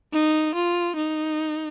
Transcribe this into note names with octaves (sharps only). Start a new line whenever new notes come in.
D#4
F4
D#4